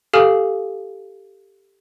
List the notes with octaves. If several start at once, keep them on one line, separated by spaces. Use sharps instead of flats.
G4 A4 F5 G#5 D#6 F6